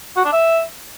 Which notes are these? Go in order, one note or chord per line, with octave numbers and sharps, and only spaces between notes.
F#4
D4
E5